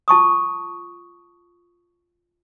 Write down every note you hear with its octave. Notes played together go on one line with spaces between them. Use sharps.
F4 A5 C#6 D#6